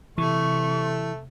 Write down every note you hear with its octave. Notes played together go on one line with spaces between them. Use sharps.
C3 E3 A3 C#6